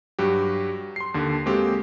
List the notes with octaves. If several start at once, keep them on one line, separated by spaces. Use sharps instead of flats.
G2 F#3 F#4 G4
C6 C7
D#2 D3
G#3 A#3 C4 F#4 G4 A4